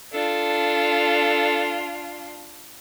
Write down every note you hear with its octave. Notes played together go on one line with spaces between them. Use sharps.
D4 F4 A4